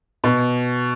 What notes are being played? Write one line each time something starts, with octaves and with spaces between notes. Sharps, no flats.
B2